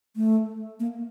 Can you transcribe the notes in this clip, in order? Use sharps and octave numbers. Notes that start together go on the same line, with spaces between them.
A3
A#3